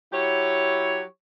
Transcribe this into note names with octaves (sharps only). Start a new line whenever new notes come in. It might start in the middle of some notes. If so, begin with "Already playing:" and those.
F#3 E4 G4 C#5